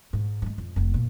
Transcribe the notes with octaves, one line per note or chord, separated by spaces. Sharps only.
G#2
E3 G#3
F2
F1 C4
A#2